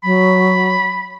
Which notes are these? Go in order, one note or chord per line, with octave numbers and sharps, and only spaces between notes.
F#3 B5